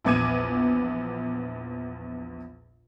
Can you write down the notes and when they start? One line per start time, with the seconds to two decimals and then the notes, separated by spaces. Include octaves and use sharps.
0.05 A#1 E2 B3 D6 G#6 D#7